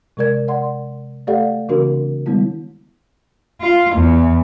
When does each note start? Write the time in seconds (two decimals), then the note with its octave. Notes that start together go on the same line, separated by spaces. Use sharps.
0.17 C3 G#3 A#4 D5 G#6
0.48 D5 F#5 C6
1.27 A3 G4 A4 D5 F5 F#5
1.69 C#3 E3 C4 D4 F#4 A#4
2.26 D#3 G3 G#3 B3 E4
3.61 F4
3.95 E2